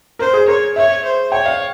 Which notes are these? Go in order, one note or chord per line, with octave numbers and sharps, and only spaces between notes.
A#4 C5
G#4
A#4 C#5
C#5 E5
C5
C#5 G5
F5